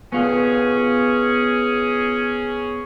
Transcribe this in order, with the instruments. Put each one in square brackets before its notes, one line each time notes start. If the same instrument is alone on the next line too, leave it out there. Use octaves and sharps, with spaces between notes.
[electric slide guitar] B3 F4 [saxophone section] C#4 G#4